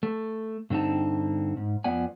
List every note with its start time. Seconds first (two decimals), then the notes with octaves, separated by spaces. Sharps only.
0.03 A3
0.70 G2 D3 C4 D#4 A5
1.57 G#2
1.84 F2 F3 B3 D5 F#5 G#5